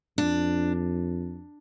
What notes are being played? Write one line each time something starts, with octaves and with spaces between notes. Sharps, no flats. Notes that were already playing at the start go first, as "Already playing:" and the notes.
F2 D4